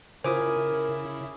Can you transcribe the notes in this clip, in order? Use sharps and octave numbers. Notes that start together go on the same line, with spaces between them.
C#3 E4 F4 A#4 C5 G#5 D6 D#6